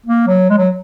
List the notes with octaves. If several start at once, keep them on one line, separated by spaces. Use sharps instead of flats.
A#3
F#3
G#3
F#3